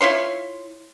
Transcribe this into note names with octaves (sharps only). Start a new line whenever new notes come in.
E4 F4 C#5 C6